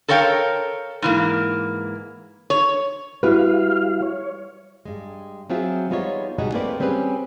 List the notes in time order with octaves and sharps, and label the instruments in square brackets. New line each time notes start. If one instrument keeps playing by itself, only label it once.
[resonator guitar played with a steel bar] A4 A#4 C#5 F5 G5
G#2 E3 A#3
C#5
[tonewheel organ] G3 F5 [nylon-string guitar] E4 F#4 B4
[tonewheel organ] C#5
[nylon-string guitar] G2 G#3
F#3 C4 F4 G#4 E5
G3 G#3 B3 D#4 F4 C#5
G2 B2 G3 G#3 D#4 F#4
G3 A3 A#3 C4 B4 D5
G3 C4 C#4 G#4 B4